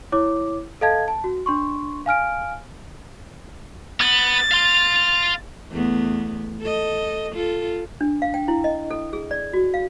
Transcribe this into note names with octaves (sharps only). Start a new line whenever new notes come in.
E4 C#5 D6
A4 D#5 F5 A5 G#6
A5
F#4
D4 C6 C#6
F5 G#5 F6 D7
B3 A6
F5 C6
E2 A3 B3
A4 D#5
F4 A4
D4
F5
G5
E4
D#5
A4
G#4
D5
F#4
F5